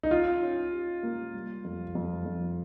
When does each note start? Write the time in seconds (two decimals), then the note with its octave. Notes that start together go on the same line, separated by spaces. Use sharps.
0.03 D#4
0.11 C#4 F4
0.41 C#4
0.73 G4
1.03 A#3
1.34 G3
1.64 F2
1.95 F2
2.26 F2